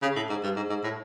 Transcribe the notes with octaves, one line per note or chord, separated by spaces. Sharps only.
C#3
A2
G#2
G2
G#2
G#2
A2